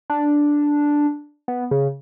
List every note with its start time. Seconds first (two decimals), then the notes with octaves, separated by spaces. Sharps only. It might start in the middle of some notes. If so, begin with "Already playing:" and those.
0.10 D4
1.48 B3
1.71 C#3